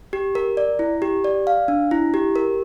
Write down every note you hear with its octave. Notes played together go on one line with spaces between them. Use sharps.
G4
A#4
D5
E4
G4
D5
F5
D4
E4
G4
A#4